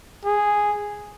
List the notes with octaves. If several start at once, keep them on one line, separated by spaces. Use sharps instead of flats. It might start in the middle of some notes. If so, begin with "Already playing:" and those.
G#4